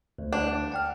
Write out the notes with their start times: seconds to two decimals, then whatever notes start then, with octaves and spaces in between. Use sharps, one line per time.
0.18 D2
0.33 D4
0.72 F#5 G5 F6